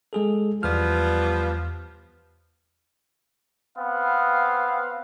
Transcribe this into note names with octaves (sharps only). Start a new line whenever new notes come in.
G#3 G#4 A4
E2 F3 G3 B3 F6
B3 C4 F5